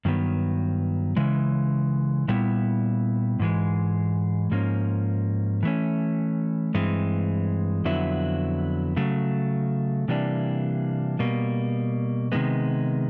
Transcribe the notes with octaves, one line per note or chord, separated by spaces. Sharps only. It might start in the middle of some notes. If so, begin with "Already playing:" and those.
G2 D#3 F#3 B3
C#3 E3 G#3
A#2 G3 B3 E4
G#2 E3 G#3
G#2 F3 A#3 C#4
E3 A3 C#4
G2 E3 G#3 C4
F2 D3 F#3 B3 E4
C#3 F#3 A3
C3 E3 G3 A#3 D4
B2 G3 A#3
C3 D#3 G#3 B3